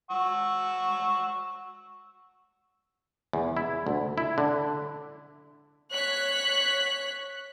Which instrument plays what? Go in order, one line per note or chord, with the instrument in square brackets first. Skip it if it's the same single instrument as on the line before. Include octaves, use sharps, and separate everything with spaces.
[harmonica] F#5 C#6 E6
[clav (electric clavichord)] E2
E4
D2
E4
D3
[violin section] C#5 F#6 B6